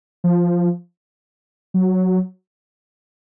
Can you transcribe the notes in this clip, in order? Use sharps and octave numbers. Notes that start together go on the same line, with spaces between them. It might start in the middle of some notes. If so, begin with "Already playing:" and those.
F3
F#3